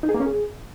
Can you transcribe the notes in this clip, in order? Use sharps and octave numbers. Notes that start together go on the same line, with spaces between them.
D#4
G#4
A#3
C#4
G#4